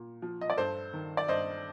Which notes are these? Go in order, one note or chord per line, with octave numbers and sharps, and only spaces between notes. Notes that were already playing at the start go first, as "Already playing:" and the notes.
Already playing: A#2
F3
D#5
D5
G2 A4 C5
D#3
D5
G2 C5 D#5